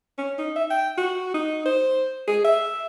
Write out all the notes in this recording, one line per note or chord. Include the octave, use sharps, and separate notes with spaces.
C#4
D#4
E5
G5
F#4
D#4
C5
G#4
E5